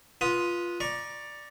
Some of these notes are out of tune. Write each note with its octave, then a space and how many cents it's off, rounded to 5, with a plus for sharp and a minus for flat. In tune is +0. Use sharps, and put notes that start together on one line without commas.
F4 +0 B4 -20 D#6 +0
D5 +5 A#5 +25 C#6 -5